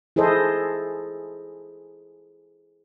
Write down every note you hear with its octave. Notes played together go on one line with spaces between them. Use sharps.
E4 G#4 A4 C5 D#5